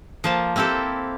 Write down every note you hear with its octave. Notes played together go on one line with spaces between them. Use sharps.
F3 A#3 A5
A#3 C4 E4 G4 A4